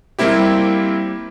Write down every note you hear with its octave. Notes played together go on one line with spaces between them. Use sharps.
G3 A#3 C4 E4 G4